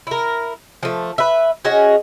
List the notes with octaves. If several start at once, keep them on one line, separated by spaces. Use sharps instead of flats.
E4 A#4
F3 A3
B4 E5
C#4 F#4 G#4 D#5